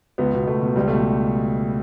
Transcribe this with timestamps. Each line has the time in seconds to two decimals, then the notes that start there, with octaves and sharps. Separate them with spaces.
0.18 C#2 B3
0.33 B2
0.46 C#2 A3
0.61 B2
0.75 C#2 G3
0.88 B2 A3
0.99 G3